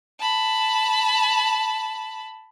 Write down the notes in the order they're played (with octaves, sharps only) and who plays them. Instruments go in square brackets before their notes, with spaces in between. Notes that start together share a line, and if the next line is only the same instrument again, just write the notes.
[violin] A5 B5